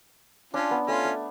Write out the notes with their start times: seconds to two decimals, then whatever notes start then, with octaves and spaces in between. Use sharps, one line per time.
0.53 C#4 D4 F4
0.71 B3
0.87 A3 C#4 F4
1.05 A3